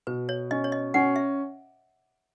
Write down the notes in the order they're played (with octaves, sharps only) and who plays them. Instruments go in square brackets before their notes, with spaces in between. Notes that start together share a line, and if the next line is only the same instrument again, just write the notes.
[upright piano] B2 [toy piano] B4
[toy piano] C#5
[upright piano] C#4 [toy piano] D#5
[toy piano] C#5
D#5
[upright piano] C#4 [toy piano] F#5
[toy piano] E5